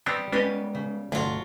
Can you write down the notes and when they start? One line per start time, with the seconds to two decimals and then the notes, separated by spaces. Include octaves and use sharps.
0.06 G3 B3 C4 D4
0.32 G#3 B3 C#4 D4 G4 B4 C#5 D#5
0.75 C#3
1.12 G1 D2 B2 F#3 A3 F4